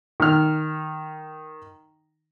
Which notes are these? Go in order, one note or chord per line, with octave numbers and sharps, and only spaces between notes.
D#3 F6